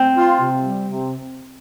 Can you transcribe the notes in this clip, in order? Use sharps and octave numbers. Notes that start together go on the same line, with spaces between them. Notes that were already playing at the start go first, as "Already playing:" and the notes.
Already playing: C4
F4
C3
G3
C3